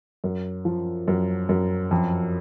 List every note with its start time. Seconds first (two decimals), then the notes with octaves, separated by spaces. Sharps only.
0.24 F#2
0.65 F3
1.08 F#2
1.49 F#2
1.91 F2